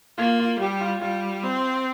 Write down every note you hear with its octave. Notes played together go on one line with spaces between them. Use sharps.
A#3 F4
F4
G3 G4
F4
G3 F4
C4